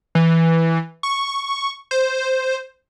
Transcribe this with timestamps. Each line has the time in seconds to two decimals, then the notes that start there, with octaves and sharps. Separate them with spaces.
0.15 E3
1.03 C#6
1.91 C5